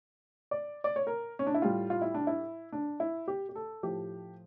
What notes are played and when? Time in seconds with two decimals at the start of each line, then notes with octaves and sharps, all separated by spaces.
0.51 D5
0.84 D5
0.96 C#5
1.07 A#4
1.39 C#4
1.47 D4
1.55 E4
1.62 A2 G3 F4
1.90 F4
2.02 E4
2.14 D4
2.27 E4
2.72 D4
3.00 E4
3.28 G4
3.49 G4
3.55 A4
3.83 A2 F3 A3 G4